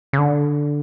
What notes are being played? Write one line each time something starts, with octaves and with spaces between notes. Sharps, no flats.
C#3
D3